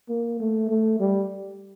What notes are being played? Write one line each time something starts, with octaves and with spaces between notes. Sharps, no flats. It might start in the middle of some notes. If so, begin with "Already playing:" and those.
A#3
A3
A3
G3